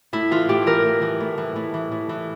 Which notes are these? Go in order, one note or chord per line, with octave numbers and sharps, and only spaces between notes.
A2 E4
E3 F4
A2 G4
E3 A#4
A2
E3
A2
E3
A2
E3
A2
E3